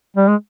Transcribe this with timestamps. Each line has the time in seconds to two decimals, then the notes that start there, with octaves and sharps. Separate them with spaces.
0.16 G3
0.28 G#3